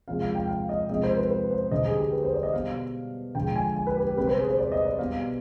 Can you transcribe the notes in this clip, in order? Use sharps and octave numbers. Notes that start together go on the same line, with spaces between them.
C3 F3 G#3 F5
F5
G5
F5
D#5
C3 F3 G#3 D#5
C5
B4
B4
C5
D3 G3 D#5
G#4
G4
B4
C5
D5
D#5
B2 G3 F5
D3 F3 G#3 G5
G#5
G#5
B4
G4
G4
C3 G3 B4
C5
G#4
C5
D5
D#5
D5
B2 G3 F5